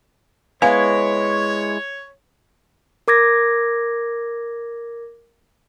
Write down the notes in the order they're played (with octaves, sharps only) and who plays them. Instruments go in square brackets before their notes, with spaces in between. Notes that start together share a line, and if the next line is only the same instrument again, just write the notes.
[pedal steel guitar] G#3 E4 [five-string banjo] B3 [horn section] C#5 [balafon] F5 G#5
[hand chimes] A#4 D6 G#6 A#6